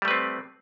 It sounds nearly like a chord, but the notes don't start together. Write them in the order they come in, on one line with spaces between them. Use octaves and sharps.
G3 A3 B4 C4